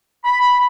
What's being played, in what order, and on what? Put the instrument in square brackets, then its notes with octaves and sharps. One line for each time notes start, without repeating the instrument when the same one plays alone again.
[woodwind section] B5